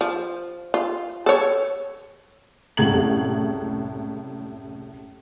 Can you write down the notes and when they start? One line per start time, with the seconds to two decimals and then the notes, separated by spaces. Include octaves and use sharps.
0.01 F3
0.74 F4
1.26 A4 C#5
2.77 F#1 C2 A2 G#3 G#6 F#7